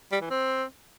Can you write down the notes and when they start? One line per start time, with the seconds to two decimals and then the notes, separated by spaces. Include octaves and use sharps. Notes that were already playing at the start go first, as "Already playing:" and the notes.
0.12 G3
0.21 E3
0.30 C4